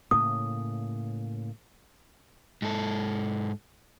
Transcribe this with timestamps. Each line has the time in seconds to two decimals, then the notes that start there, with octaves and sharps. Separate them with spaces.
0.11 A2 C#3 A#3 D#6
2.62 G#2 A4